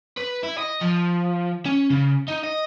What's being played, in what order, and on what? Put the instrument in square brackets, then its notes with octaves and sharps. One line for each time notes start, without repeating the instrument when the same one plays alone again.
[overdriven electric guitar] B4
E4
D#5
F3
C#4
C#3
D#4
D#5